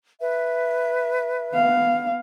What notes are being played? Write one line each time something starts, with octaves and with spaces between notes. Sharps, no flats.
B4 E5
B3 F5